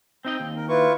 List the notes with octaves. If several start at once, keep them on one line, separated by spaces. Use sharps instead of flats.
C4 D#4 D#5 G5
D#2
A#4
E4 F4 B4 C#6